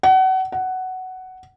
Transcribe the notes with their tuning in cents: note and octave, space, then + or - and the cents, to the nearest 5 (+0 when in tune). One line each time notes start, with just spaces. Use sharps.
F#5 +30
F#5 +10